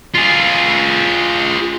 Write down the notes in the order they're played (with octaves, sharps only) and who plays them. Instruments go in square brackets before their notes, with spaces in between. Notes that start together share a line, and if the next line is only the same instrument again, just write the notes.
[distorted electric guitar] F4 G#4